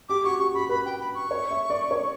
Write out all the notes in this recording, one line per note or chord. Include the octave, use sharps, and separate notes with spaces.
G4 D6
F#4 C#6
G4 C#6
G4 B5
B4 B5
G5
B5
C#6
C#5
E5
D5
C#5